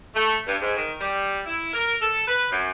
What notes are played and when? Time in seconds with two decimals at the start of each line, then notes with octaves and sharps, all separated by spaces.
0.14 A3
0.46 G2
0.60 G#2
0.76 D#3
0.99 G3
1.45 E4
1.73 A#4
2.01 A4
2.27 B4
2.51 F#2